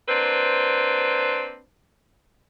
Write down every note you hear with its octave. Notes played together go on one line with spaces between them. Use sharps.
A#3 C4 D4 B4 C5